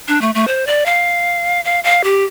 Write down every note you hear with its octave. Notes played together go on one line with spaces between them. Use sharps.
D4
A3
A3
C5
D5
F5
F5
F5
G4